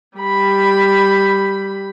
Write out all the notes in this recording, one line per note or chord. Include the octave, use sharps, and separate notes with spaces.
G3 B5